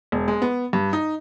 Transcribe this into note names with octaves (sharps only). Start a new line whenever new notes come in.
E1
G#3
B3
G2
D#4